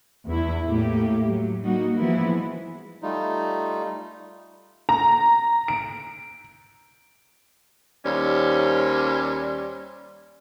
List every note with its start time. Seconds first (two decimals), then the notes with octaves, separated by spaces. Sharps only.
0.25 E2 E4
0.66 A2 A3 A#3 G4
1.25 F#3
1.62 G3 A#3 D#4 F#4
1.97 E3 F3 G#3 B3 E4
3.02 G3 A3 D#4 F4
4.89 A#5
5.68 D7
8.05 D#2 G3 C#4 C5